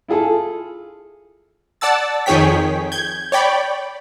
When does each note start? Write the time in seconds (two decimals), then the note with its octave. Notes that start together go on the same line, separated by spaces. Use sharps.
0.08 E4 F4 G#4 A4
1.81 D5 F#5 A5 E6 A6
2.26 F2 D#3 G#4 C#5 G5 B6
2.92 G6 G#6
3.32 C#5 D5 G5 B5